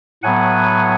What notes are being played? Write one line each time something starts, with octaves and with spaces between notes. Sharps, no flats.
A2 F#3 B3 F#5 G#5